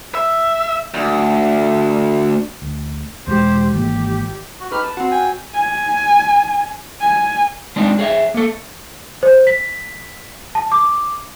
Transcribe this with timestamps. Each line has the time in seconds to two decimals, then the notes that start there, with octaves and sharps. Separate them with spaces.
0.15 E5
0.94 D2
2.62 D2
3.27 E2 B2 G#3 G4 C5
3.74 G#1 E3 A#3 G4
4.60 F#4
4.72 D#4 G4 B4 F6
4.83 A5
4.97 C4 F#4
5.11 G5 G#5
5.54 G#5
7.01 G#5
7.76 G#3 C4 D4 D#4
7.99 G#4 C#5 D5 E5
8.34 A#3 A4
9.23 C5
9.47 B6
10.55 A5
10.72 D6